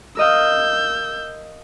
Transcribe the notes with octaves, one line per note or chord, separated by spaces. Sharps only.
A#4 D#5 F5 E6 G6